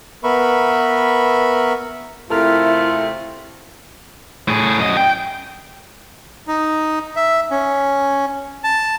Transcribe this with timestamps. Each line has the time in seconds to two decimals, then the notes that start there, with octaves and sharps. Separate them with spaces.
0.24 B3 A#4 B4 E5 B5 C#6
2.30 C3 A3 E4 F4 A4 A#4 F6
4.48 A2 G#4
4.80 F#2 D#5
4.97 G5
6.48 D#4
7.16 E5
7.51 C#4
8.64 A5